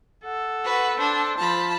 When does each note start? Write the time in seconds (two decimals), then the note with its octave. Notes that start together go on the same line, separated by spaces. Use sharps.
0.25 A4 F#5
0.65 F#4 B4
0.98 D4 C5
1.38 F3 A5 B5